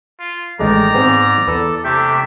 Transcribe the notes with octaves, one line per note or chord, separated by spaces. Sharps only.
F4
A1 D#3 G#3 A3 D5 A#5
G#2 B3 C4 G#4
E2 A4 B4
C3 A3 D4 G4 E5 G5